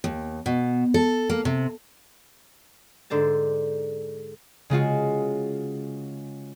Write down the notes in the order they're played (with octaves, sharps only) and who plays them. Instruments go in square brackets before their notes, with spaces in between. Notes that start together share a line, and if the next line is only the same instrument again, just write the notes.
[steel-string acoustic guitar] D#2
B2
A4
A#3
C3
[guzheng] G#2 D3 C5 A5
[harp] C#3 G#3 F4 F#4